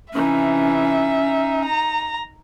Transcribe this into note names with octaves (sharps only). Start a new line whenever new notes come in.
C3 E3 C#4 D#4 E5
D#4
A#5